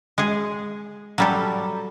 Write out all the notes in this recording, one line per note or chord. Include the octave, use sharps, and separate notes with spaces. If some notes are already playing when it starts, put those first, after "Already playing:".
G#3 G#4
F#3 G3 A4